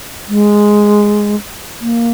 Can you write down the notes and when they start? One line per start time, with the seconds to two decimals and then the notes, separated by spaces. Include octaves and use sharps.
0.28 G#3
1.81 A#3